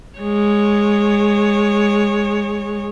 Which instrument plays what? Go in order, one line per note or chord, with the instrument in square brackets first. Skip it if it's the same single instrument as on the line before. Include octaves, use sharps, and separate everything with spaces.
[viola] G#3 C#5